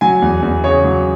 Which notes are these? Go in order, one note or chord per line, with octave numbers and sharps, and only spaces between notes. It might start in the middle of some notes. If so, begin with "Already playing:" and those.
F#3 G#5
E2
E2
C#3 C#5
F#3